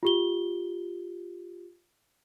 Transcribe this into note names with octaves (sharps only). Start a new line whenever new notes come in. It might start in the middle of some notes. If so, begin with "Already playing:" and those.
F4 G4 G7